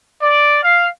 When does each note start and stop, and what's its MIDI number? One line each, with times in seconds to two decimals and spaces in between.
0.22 0.60 74
0.63 0.88 77